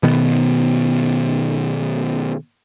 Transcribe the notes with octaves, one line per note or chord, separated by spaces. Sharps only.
B2 D#3 B3